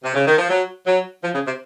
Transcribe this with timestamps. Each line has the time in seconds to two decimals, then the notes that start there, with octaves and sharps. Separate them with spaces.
0.04 C3
0.15 C#3
0.27 D#3
0.38 F3
0.50 F#3
0.87 F#3
1.23 F3
1.35 C#3
1.47 C3